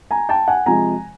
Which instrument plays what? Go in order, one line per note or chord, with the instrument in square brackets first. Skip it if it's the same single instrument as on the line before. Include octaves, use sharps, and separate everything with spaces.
[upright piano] G#5 A#5
G5 A5
F#5 G#5
C3 F3 G#3 G#5 A#5